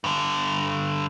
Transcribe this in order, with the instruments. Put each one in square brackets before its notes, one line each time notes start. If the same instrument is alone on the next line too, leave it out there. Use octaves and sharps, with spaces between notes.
[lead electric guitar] G2 D3